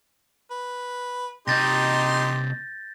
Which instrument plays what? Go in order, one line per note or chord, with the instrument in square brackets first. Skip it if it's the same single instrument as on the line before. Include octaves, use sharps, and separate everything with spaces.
[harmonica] B4
[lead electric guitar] C3 D#5 [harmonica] D#4 G4 C6 [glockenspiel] G6 A6 A#6